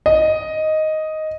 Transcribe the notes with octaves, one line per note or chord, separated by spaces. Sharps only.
D#5